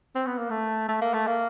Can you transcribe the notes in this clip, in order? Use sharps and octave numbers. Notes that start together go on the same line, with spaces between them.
C4
B3
A#3
A3
A3
A#3
A3
A#3